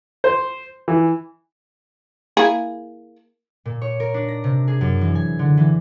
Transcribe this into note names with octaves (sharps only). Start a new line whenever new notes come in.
C5
E3
A#3 E4 G#4
A#2
C#5
A#4
D4
A#6
C3
G#4
F#2
E3
G#5
D3
E3